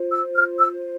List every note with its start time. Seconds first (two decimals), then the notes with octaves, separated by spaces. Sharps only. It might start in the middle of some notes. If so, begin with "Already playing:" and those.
Already playing: F4 C5
0.12 E6
0.36 F6
0.59 E6